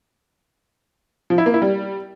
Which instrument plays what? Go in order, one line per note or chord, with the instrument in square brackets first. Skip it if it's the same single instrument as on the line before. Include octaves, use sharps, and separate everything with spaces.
[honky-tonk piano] F3
E4
A#3
E4
G3